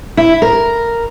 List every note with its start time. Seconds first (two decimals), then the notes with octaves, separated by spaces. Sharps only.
0.17 E4
0.42 A#4